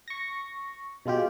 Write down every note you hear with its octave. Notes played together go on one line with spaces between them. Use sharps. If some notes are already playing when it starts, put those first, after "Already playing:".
C#6 A#6
B2 G#3 F4 G4